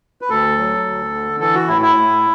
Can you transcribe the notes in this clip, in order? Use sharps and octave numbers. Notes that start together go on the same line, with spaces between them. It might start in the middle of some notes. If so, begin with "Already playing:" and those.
B4
D2 A4
F#3
D2
D3
E3 A4
F#4
A2 E4
E4
A2